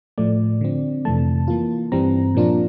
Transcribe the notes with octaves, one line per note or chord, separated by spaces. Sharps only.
A2 F3 A3 D5
D3 F3 C4
F2 C3 E3 A3 A5
E3 A#3 F4
G2 E3 G3 C4 A#5
A#2 F3 A#3 D4 F4